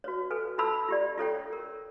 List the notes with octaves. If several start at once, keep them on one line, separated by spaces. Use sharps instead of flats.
F#4 B4 C#5
A4 B4 G#5
F4 A4 A5 B5 E6
F4 G4 D5
F4 A4 C#5 G5
A#4